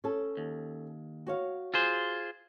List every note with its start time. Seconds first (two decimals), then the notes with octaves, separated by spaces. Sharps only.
0.04 C#4 A4
0.37 D#2
1.27 F#4 C#5 F5
1.74 F4 G#4 C5